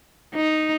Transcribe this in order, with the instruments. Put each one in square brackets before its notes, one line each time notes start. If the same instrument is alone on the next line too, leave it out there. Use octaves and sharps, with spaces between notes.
[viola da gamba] D#4